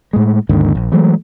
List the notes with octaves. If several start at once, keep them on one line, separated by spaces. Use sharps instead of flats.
A2 G#3
G#1 D#2 G#2 D3
A#1
E3 F#3 G#3 A3